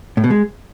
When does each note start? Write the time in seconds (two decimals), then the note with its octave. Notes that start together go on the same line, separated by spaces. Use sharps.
0.17 A2
0.24 B2
0.30 G#3